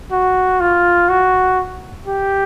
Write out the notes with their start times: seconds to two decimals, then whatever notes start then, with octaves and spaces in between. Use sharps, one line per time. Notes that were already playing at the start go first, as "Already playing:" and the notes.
0.12 F#4
0.60 F4
1.09 F#4
2.06 G4